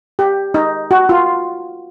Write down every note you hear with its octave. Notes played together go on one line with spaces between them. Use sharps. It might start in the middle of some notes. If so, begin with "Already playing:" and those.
G4
D#4
F#4
F4